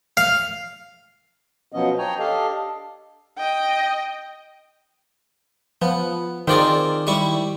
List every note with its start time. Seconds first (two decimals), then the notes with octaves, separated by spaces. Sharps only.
0.17 F5
1.72 B2 F3 F#3 B3 C#4 D#5
1.99 D4 C#5 G5 G#5 A#5
2.19 D4 G4 A4 D#5 F5
3.38 D#5 G5
5.82 F3 B3
6.48 D#3 C4 F4 G#4 D5
7.07 G3 E4 C#6